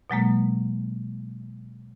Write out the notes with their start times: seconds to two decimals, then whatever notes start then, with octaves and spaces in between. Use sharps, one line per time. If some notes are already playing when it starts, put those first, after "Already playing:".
0.10 B2 F#3 G#3 A#3